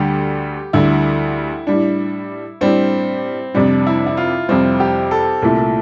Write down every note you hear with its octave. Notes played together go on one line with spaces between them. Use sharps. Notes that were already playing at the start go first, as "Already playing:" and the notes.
Already playing: D2 D3 G3 G4
D2 D3 G3 E4
A2 G3 D4
A2 G3 C4 D4
F2 C3 G3 D4
E4
E4
F4
F2 C3 G3 C4
G4
A4
C2 A#2 A3 E4 A4